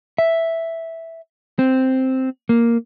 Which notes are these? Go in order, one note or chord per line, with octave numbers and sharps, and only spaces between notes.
E5
C4
A#3